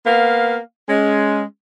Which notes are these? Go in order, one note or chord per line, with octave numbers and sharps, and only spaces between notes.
A#3 B3 F5
G#3 C#4